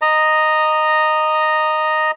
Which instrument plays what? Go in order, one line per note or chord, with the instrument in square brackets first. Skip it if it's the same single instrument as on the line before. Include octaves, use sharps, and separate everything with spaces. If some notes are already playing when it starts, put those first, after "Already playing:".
[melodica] D#5 A#5